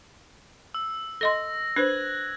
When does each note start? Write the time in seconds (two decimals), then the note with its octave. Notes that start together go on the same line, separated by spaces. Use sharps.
0.74 E6
1.21 A4 D#5 C6 A#6
1.76 D4 B4 C5 F#6 G#6 F#7